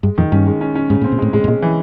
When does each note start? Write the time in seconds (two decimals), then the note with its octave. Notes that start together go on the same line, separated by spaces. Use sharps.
0.03 G2 G#3
0.18 F2 D#3
0.32 G2 C#4
0.47 G#3
0.61 C#4
0.75 C#4
0.90 G#2 C#3
1.01 A2
1.04 C4
1.12 A#2
1.18 A2 G#3
1.33 A2 G#3
1.44 A2
1.48 A#2 G#3
1.62 E3